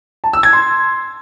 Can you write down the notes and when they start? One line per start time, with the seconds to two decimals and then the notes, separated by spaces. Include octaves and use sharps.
0.24 A5
0.33 E6
0.43 G#6
0.53 C6